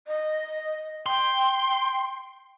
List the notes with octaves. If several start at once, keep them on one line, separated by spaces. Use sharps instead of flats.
D#5
G5 C6